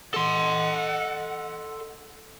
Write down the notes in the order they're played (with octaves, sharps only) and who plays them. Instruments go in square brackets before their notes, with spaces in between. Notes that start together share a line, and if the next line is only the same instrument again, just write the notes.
[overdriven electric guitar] A4 C6 [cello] D#5 F#5